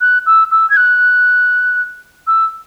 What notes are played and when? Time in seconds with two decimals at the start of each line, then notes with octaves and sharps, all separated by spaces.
0.01 F#6
0.26 E6
0.51 E6
0.70 G#6
0.77 F#6
2.27 E6